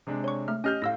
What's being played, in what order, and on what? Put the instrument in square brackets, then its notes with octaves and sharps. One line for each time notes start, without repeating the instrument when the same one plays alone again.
[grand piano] C3 G#3 D4
[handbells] C#5 C#6
A3 F6
[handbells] C#4 G4 [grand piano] D#5 F6 G6
[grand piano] A2 [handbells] F5 E6 A#6